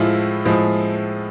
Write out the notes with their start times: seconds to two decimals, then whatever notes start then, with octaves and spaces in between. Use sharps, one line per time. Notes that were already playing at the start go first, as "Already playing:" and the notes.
Already playing: A2 F3 G#3 E4 F4
0.45 A2 F3 G#3